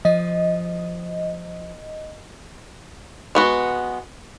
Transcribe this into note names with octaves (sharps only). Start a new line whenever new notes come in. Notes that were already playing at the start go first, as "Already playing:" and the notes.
F3 D#5
G#3 B3 F#4